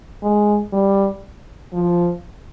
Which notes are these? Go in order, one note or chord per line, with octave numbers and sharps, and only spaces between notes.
G#3
G3
F3